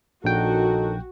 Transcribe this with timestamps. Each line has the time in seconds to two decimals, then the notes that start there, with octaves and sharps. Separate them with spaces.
0.24 A#1 D#2 D#4 F#4 A4 G5